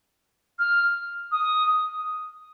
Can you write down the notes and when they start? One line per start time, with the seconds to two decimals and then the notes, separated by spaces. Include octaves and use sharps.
0.59 F6
1.32 D#6